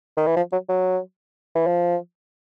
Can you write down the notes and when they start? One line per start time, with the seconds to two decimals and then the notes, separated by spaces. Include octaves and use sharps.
0.17 D#3
0.27 E3
0.36 F3
0.52 F#3
0.69 F#3
1.55 E3
1.67 F3